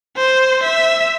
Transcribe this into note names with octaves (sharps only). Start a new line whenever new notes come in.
C5
E5